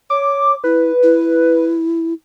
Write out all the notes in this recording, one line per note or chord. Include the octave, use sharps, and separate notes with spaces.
C#5 D6
E4 B4
E4